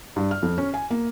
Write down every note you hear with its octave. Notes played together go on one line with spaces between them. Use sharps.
G2
F6
F2
C#4
G#5
A#3